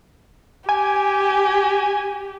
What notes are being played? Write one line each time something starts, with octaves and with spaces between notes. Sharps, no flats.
G4 G#5